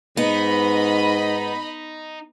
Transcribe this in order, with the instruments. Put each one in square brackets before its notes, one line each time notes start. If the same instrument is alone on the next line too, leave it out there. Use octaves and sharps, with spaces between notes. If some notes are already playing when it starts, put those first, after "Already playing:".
[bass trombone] G#2 [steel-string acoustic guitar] B3 [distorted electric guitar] D#4 [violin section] D#5 B5